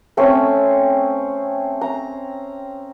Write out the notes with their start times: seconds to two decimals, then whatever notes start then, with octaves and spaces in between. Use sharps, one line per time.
0.17 A3 C4 C#4 C#5
1.81 A#5